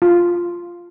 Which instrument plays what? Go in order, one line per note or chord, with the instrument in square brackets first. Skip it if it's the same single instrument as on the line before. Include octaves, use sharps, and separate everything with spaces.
[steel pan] F4